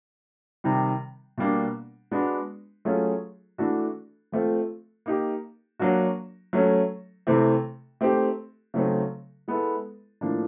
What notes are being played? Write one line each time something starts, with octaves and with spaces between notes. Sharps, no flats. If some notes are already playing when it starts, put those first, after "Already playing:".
C3 D#3 G3
B2 G3 A#3 D4
G#3 B3 D4 F#4
F#3 A3 C#4 F4 G#4
E3 A3 D4 F#4 A4
F3 A3 C4 F4
A#3 D#4 G4
F#3 A#3 D4 F#4
F#3 A3 C#4
C3 E3 A3 C4
A3 C4 D#4 G4
C#3 F#3 A3 C4 D#4
G#3 B3 E4 A4
A2 F3 A#3 D4